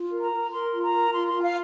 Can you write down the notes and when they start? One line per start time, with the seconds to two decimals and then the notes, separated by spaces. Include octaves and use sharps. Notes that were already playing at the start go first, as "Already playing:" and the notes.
Already playing: F4
0.11 A#4
0.21 A#5
0.31 A#4
0.51 A#4 C6
0.72 F4
0.82 A#5
0.92 A#4
1.12 F4 C6
1.27 C6
1.33 F4
1.43 F5